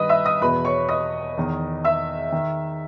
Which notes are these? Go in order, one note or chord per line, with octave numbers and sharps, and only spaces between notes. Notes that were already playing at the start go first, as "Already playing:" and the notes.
Already playing: G2 D#3 B4 D#5 B5 D#6
E5 E6
D#5 D#6
E2 B2 B4 B5
C#5 C#6
D#5 D#6
E2 D#3
E5 E6
D#3